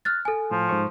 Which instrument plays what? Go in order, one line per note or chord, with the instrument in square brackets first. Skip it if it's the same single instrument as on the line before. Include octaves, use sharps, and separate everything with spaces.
[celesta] F6 F#6 A6
A4 G#5
[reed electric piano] A2 [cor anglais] F3
[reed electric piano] G#2 C5 C#6